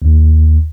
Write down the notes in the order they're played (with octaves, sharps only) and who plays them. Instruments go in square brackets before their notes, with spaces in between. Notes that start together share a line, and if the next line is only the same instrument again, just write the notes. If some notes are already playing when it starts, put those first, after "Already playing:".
[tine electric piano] D#2